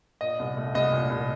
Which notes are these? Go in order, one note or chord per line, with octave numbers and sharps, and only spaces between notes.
A#2 D#5
C2
A3
C2 D#5
A#2
C2